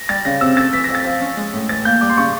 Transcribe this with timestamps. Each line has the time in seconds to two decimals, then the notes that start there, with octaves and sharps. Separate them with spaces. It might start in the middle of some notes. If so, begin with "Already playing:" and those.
Already playing: A#6
0.09 G3 A6
0.25 C#3 A#6
0.41 C3 E6
0.57 A3 A6
0.73 E3 B6
0.84 A#6
0.89 F2
0.95 A6
1.05 F3
1.21 C#4
1.37 G#3
1.53 A2
1.69 E3 A6
1.85 A#3 G6
2.01 G3 D6
2.10 C6
2.17 C#3 C#6